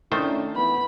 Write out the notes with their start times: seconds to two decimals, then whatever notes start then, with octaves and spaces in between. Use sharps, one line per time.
0.12 D#3 A3 C#4 D4 E4 C5
0.56 E3 B3 B5